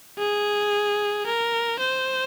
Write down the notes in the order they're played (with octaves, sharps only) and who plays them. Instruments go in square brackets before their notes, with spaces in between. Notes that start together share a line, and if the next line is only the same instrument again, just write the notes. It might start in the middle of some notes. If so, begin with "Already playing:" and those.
[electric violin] G#4
A#4
C5